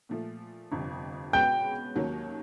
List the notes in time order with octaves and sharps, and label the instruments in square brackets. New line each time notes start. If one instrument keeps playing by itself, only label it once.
[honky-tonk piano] A#2 F3 A3
G1 F2 C3
[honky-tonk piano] B2 G#3 C#4 F#4 B4 [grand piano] G5 G6
[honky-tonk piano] D#2 D#3 F#3 A#3 C#4